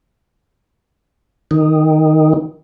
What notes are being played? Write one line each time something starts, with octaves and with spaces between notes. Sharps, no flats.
D#3